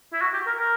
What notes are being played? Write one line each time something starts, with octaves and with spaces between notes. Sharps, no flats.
E4
F#4
G4
A#4
A#4